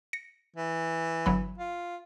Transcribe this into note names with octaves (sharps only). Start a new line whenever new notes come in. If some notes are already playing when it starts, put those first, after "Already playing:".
A#6 C#7
E3
G1 F#3 B5
F4